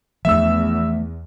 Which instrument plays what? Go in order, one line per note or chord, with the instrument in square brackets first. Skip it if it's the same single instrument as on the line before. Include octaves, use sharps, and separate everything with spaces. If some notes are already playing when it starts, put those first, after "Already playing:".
[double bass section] E2 [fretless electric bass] F3 A3 D4 [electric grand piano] E5 E6